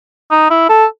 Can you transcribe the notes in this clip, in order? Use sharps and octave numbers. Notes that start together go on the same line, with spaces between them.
D#4
E4
A4